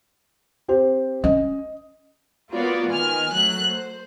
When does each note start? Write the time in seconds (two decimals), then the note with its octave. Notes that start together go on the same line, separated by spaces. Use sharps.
0.68 C4 G4 C5
1.24 C#4 D#5
2.51 A#3 B3 F4 F#4 C#5 D5
2.90 D#3 B3 G#5 F6
3.33 F#3 A3 F#6
3.64 C5